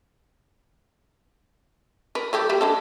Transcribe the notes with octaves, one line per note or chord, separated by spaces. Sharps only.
A#4 B4
F#3 A3 G4
G3 A#3
G#3 D4 A4